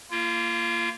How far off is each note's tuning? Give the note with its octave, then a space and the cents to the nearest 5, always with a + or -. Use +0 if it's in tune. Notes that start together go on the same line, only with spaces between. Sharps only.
A#3 -10 F4 -35